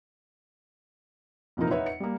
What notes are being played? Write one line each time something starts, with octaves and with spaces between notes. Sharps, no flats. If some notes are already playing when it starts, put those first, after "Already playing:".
F1 A#2 E3 F3 D#4 A#4
D#4 B4 C#5 E5 F#5
C#7
G3 A#3